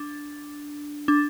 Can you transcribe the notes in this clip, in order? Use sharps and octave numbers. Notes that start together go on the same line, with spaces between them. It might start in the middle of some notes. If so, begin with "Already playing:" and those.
Already playing: D4
D4